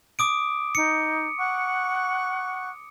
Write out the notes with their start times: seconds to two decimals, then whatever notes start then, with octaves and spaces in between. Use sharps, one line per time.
0.19 D6 D#6 D7
0.75 D#4 C#7
1.38 F#5 C#6 F#6